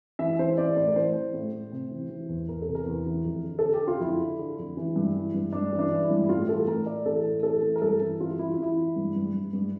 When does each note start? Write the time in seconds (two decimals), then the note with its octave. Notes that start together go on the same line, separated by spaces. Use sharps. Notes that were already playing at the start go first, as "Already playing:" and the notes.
0.19 E3 E5
0.39 E3 C5
0.58 E3 D5
0.77 A2 D5
0.88 A#4
0.96 E3 C5
1.15 E3
1.34 A2
1.53 A2
1.72 C3
1.92 E3
2.10 E3
2.29 E2
2.48 E2 A#4
2.62 A4
2.68 C3
2.75 A#4
2.86 E2
3.06 E3
3.25 F2
3.44 D3
3.59 D3 A4
3.74 G4
3.82 D3
3.87 F4
4.00 F2 E4
4.20 D3
4.39 D3
4.58 F2
4.77 E3
4.96 G2
5.16 E3
5.34 G2
5.52 G2 D4
5.73 E3
5.79 D4
5.91 E3
6.04 E4
6.10 G2
6.23 E4
6.29 A2 F4
6.49 E3 A4
6.67 A2 A#4
6.86 A2 D5
7.06 E3 A4
7.24 A2
7.43 E3 A4
7.62 E3
7.76 A#4
7.82 G2 A4
8.01 E3
8.20 E3 F4
8.38 E3 E4
8.51 F4
8.58 E3 E4
8.77 E3
8.96 G2
9.15 G2
9.34 G2
9.53 G2